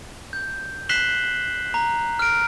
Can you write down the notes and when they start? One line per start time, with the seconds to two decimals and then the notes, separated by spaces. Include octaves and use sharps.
0.33 G6
0.89 F#6 B6 C7 E7 F#7 G7
1.74 A#5
2.19 F6 D7